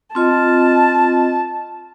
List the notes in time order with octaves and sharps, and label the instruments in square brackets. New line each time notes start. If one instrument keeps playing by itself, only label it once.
[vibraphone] C4 F4 D#5 [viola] A5